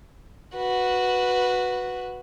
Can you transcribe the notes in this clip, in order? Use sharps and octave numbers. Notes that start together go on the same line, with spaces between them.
F#4 B4